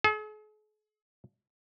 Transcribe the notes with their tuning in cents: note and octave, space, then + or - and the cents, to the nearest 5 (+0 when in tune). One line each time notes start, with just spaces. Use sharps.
G#4 +45